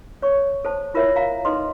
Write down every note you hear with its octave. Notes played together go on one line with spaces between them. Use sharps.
C#5 C#6
A4 C5 A5
E4 F4 A#4 C5 C#5 E5
F5 A#5
D#4 A4 B4 D#5 C6